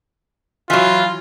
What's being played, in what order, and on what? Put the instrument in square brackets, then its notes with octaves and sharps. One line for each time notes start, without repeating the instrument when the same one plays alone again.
[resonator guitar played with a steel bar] E3 F#3 [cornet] F4